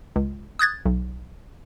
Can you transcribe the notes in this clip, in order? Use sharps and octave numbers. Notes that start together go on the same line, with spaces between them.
C#2
D#6 F#6 G#6 A6
B1